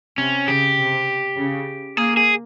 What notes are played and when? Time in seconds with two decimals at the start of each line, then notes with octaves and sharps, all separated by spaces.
0.18 C3 C#4
0.48 C#3 G4
0.77 C3
1.38 C#3
1.97 A#3 G#4
2.17 G#4